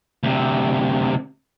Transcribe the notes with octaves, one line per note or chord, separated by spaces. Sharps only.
D2 C3